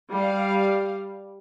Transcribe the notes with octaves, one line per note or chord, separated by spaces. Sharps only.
G3 F5